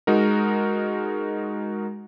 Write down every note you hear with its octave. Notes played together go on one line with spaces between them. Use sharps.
G#3 D#4 F#4 A#4